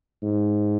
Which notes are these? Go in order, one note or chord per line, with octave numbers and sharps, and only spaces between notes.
G#2